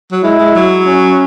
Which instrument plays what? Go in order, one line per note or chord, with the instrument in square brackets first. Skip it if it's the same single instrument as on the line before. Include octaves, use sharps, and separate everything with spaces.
[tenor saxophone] F#3
[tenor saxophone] G#3 [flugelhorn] E4
[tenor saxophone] G#3
F#3
[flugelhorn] C#4